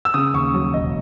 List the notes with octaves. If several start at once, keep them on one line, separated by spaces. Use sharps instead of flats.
E6
C#3 D#6
D#2 C#6
F#3
E1 D#5